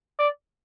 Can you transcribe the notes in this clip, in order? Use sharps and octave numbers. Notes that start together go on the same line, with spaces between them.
D5